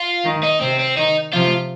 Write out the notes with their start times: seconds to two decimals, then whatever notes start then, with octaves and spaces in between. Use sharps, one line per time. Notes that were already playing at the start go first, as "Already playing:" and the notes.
Already playing: F4
0.24 D#3
0.43 D#4
0.61 C3 C4
0.79 C4
0.97 D#3 D#4
1.33 C3 F3 F4